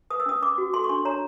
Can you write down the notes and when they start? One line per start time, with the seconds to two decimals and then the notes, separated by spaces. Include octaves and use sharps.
0.10 B4 D#6
0.20 E6
0.26 C#4 D#6
0.42 C#4 D6
0.58 F#4
0.74 A4 C6
0.84 C#6
0.89 D4 C6
1.05 C#5 A#5